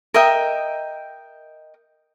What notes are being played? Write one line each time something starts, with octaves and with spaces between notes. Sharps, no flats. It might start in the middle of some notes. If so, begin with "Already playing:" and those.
A#4 D#5 E5 G5